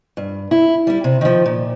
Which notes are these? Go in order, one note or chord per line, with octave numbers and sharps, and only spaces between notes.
G2
E4
G3 E4
C3
D#3 F3
A#2